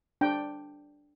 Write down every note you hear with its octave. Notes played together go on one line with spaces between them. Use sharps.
D4 G5